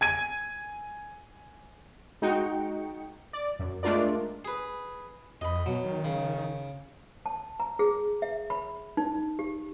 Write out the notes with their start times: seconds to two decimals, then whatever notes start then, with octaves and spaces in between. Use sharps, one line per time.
0.01 G#5 G#6 D#7
2.22 G#3 D#4 F#4 G5 C#7
3.33 D5
3.59 F#2
3.83 G#3 A3 D4 F4 A#4 D5
4.45 G#4 B4
5.41 F2 D#5 B5
5.66 B2 F#3
5.84 D#3
6.04 C#3
7.26 A5
7.60 A#5
7.79 G#4
8.22 E5
8.50 B5
8.97 D#4
9.39 G4